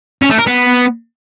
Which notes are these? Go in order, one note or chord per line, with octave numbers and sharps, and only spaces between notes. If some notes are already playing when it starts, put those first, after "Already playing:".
C#4
A3
A#4
B3